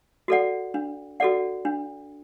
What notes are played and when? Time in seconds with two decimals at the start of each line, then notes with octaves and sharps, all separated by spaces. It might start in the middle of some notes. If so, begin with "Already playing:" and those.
0.28 F#4 A4 D5 F#5
0.74 D4
1.20 F#4 A4 D5 F#5
1.65 D4